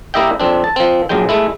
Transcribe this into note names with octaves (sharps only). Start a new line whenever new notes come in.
A#3 E4 G4 D#5 E5 G5
F2 C4 D4
A5
F3 C4
A#1 F#2 F#3 G#3 G5
G#3 A3 E4